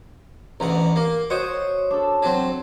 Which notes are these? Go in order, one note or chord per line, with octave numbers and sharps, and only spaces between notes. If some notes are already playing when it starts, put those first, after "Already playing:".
A1 D2 F#5 A#5
A#3
F#4 C5 C#5 D#5
D4 A4
F#3 C4